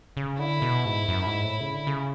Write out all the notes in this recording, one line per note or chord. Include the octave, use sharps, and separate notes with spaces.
C#3
D3 E4
B2
G#2
F#2
G#2
A2
C#3
D3
C#3